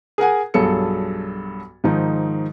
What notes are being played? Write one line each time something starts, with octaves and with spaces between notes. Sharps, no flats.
G#4 A#4 F#5 G#5
B1 G2 F#3 G#4 A4 C#7
G#2 D#3 F3 D#4